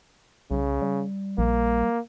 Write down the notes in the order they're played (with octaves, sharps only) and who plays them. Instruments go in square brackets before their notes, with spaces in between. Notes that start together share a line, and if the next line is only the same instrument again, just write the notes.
[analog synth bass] C2 [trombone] C#3
[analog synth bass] G3
[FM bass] A#1 [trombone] A#3